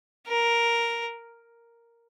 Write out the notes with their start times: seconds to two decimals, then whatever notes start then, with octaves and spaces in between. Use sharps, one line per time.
0.28 A#4